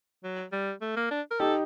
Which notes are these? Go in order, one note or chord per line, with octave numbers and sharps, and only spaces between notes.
F#3
G3
A3
A#3
D4
A#4
D#4 G4 A4